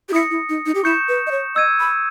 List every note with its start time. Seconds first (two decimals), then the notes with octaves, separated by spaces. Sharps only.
0.09 G4
0.13 E4 D#6 A#6 C#7
0.30 E4
0.49 D#4
0.66 D#4
0.75 G4
0.84 E4 C#6 G6 C#7 E7
1.09 B4
1.27 D#5
1.31 C#5
1.55 D#5 E6 G#6 D#7
1.80 B5